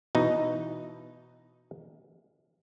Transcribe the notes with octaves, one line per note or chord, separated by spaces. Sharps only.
B2 E3 D#4